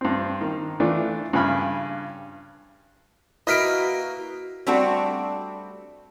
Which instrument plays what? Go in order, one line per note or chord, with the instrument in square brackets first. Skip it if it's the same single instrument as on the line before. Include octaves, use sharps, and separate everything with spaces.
[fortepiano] G2 C4
D#3
E3 A3 D4 F4
G2 C#3 G5 G#5 B5 F6
[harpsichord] A#3 B4 F5 [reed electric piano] E4 [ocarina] F#4 [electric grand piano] D#5 B6 D7
[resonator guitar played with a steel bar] G3 A3 C4 D4 F#4 A4